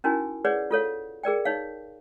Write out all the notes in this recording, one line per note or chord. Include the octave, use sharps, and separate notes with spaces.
C#4 D#4 E4 F#4 A#4 G#5
G#4 B4 C#5 D5 F#5
F4 A4 C#5 F5
G#4 A#4 D5 G5
D#4 C#5 F5